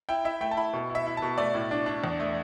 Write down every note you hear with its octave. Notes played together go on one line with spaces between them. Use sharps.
E4 G5
E4 E5
A3 G5
A5
E4 B5
B2
E4
E5
E4
A5
B2
A3 D5
A2
D4
D4
E2
A3